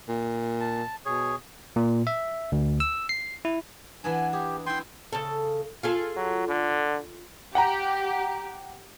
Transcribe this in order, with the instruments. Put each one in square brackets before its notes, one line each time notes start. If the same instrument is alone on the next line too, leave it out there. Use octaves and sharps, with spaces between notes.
[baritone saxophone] A#2
[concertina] A5
[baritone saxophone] B2 [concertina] G#4 C#5
[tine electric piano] A#2
E5
D2
E6
C7
E4
[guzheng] E3 B3 D4 [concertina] G#5
[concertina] G4 [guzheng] G#4
[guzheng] E4 G#5 [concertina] G5 C6
[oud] C#3 A4
F4 G#4 A4
[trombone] F#3
D3
[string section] G4 [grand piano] F#5 G5 A#5